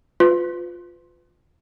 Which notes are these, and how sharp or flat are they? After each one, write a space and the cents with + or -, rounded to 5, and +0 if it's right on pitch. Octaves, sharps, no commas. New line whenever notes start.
F4 +10 B4 +30